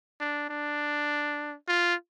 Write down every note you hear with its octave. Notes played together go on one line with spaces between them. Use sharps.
D4
D4
F4